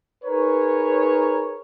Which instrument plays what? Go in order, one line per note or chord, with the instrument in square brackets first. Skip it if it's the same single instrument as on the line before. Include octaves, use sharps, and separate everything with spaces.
[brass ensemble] D#4 G#4 A#4 B4 C#5